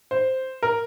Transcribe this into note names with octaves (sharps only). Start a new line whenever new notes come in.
C5
A#4